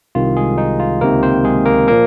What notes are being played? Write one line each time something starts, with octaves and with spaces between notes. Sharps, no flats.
C2 C3 D#3 F4
G#3 G#4
D#4
F4
C#2 C3 D#3 A#3 A#4
C4 C5
G#3 G#4
A#3 A#4
A#2 F3 A#3 A#4